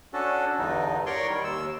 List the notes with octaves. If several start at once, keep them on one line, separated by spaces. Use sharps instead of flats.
C#4 D4 F#4 A4
E2 G2 D3 D#4
A#4 C#5 D5 C6 C#6
D#3 G3
D#2 E6